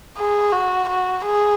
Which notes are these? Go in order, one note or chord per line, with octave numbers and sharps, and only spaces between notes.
G#4
F#4
F#4
G#4